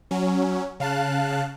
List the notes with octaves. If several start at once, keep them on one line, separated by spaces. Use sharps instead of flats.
F#3 C#4
C#3 F5 A5 F#6